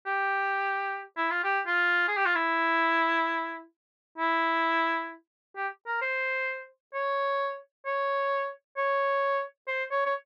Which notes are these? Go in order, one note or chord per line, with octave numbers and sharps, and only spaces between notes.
G4
E4
F4
G4
F4
G#4
G4
F4
E4
E4
G4
A#4
C5
C#5
C#5
C#5
C5
C#5
C#5